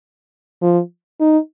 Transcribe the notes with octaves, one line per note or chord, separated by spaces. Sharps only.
F3
D#4